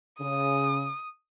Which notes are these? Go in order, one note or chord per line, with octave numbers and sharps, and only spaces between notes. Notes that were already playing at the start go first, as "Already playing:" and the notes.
C#3 D#6